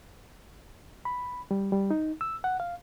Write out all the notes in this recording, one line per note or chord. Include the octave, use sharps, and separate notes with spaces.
B5
G3
G3
D#4
E6
F#5
F5